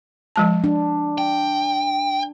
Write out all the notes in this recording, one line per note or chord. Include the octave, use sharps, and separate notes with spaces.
F3 G#3 A5
D4
G5